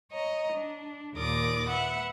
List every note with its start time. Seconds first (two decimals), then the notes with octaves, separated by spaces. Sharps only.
0.11 C#5 D#5 A#5
0.53 D4
1.16 D#2 A#2 A#4 D5 D6 D#6
1.69 B4 E5 F#5